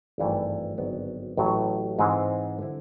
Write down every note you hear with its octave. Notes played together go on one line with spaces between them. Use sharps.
G#1 G2 E3 A3
G#1 G2 D3 F#3 B3
A1 A2 F#3
G#2 E3 G#3 C4
D3 G3 C4 E4